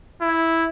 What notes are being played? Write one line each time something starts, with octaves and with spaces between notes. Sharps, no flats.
E4